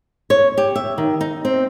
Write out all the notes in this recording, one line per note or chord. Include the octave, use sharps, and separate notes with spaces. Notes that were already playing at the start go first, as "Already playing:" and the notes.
C#5
G4
E5
D#3
D#4
C4